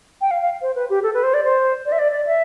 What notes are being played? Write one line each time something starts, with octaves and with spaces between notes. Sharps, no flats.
G5
F5
F5
C5
B4
G4
A4
B4
C5
D5
C5
D5
E5
D5
D5
E5